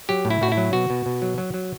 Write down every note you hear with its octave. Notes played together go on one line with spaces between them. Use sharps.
F#3 G4
A2
E4
A2 F#4
E4
F#3
B2 F#4
B2
B2
F#3
F#3
F#3